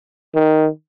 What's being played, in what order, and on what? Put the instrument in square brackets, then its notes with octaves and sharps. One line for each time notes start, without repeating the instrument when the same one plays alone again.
[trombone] D#3